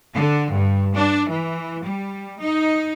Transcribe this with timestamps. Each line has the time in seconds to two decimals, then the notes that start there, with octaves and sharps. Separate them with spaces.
0.14 D3
0.51 G2
0.94 D4
1.29 E3
1.83 G3
2.40 D#4